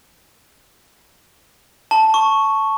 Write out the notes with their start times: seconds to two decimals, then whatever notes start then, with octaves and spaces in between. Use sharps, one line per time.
1.91 A5
2.14 C#6